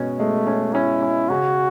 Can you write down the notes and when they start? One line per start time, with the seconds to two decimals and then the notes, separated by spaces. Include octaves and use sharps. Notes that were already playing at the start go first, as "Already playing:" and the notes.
Already playing: B2 G#3 C#4
0.20 G#3 A3
0.47 C#4
0.74 C#4 E4
1.02 C#4
1.30 C#3 F#4